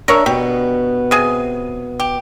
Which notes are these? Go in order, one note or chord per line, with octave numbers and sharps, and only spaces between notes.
D4 A#4 C#5 E5
B2 B3 G4
C3 G#4 G#5
G4